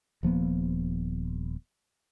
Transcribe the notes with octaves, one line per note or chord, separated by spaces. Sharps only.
D#1 F3 A#3 B3